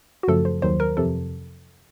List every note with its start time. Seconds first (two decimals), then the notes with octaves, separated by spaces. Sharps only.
0.23 F#4
0.28 F#2 C#3 F3 A3 A4
0.45 C5
0.62 D#2 D#3 F#3 C5
0.80 A#4
0.97 F2 C3 F3 A4